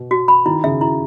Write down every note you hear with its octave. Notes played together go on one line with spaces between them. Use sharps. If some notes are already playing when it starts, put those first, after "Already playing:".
Already playing: B2
F#4
B5
D#3 E4
C#3 E5
E4